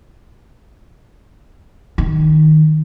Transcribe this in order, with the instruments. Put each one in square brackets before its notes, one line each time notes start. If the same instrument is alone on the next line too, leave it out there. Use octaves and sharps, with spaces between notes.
[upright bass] D#3